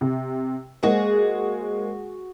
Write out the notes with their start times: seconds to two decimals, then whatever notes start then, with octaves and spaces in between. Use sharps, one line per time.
0.01 C3
0.83 G#3 A#3 F#4 G#4 C5